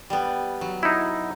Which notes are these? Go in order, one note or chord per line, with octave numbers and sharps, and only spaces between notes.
G3 B3
F#3
D#4 E4